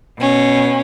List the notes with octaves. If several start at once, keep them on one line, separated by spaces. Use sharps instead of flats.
B2 C#4